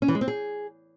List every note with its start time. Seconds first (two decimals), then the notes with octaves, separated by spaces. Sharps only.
0.02 C#4
0.08 E3
0.15 G#3
0.21 C4
0.28 G#4